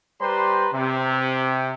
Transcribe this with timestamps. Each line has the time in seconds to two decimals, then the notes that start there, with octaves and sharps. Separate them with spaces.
0.20 G3 G4 B4 C5 A#5 C6
0.73 C3